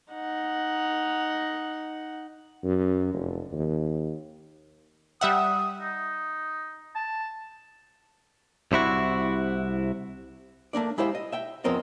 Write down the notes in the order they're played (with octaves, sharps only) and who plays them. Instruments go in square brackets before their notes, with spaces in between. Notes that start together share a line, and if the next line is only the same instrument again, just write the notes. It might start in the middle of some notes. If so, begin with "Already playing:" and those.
[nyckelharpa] D#4 F#5
[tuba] F#2
F1
D#2
[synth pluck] G3 E5 F#5 [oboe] D#6
[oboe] D#4
A5
[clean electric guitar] C2 C3 E4 F#4
[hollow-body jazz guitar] A3 A#3 D4 D5
G#3 E4 G4 C5 F5 G5
D#5
E5 G5
E2 F3 B3 C4 A#4 D#5